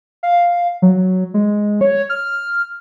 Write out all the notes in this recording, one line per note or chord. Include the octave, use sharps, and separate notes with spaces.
F5
F#3
G#3
C#5
F6